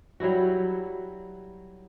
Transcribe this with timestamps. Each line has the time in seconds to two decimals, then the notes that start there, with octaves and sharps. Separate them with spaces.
0.20 F#3 G3 E4 F#4